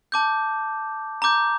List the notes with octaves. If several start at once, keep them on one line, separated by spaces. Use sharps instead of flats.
A5 D6 G6
A#5 D6 G6